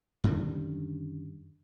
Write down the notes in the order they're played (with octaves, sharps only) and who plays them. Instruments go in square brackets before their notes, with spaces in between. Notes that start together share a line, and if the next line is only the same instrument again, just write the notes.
[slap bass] F#2 D3 D#3 G3